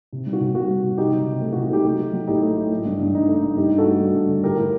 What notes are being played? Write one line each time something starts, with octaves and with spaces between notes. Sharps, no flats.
C3
G3
F#4
C3
G3 F#4
G3
C3
C3 D#4 G4
F#3
C3
A3
F#4
C3
F#4
A3 D#4 G4
A3
F#3
F#3
A2 D#4 G4
A3
A2
A3
G2
G2
G2 D#4
A3
D#4
G2
G2 D#4 G4
G2
F#4 A4
A3
G2
G2
D3
A2 G4 A#4
A2